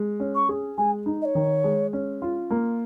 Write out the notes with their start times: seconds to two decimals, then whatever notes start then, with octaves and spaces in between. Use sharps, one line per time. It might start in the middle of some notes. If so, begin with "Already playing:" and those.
Already playing: G#3
0.20 C#4
0.34 C#6
0.49 G#4
0.77 G#3 G#5
1.06 D#4
1.21 D#5
1.25 C#5
1.35 D#3
1.64 G#3
1.93 C#4
2.22 F4
2.50 A#3